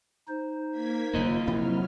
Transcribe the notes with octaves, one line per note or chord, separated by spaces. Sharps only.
D#4 C5
A#3 G#6 B6
F#1 E2 A#3 F4 D#5
C3 F3 F#3 C4 E4 F6